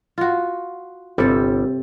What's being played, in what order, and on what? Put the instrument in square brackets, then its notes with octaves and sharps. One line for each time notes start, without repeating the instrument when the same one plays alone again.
[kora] F4 F#4
[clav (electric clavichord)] G1 G3 [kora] C3 A4